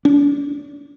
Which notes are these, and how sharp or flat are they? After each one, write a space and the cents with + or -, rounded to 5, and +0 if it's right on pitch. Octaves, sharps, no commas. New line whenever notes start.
D4 -40